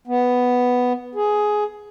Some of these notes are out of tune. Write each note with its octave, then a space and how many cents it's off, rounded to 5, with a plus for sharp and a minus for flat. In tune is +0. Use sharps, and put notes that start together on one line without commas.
B3 +5
G#4 +10